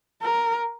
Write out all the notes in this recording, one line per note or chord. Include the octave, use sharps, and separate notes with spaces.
A#4